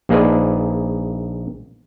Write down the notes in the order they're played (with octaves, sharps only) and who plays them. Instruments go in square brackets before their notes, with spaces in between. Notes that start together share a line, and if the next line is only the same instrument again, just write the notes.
[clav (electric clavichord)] A#1 A#3 D#4 G#4 B4 D5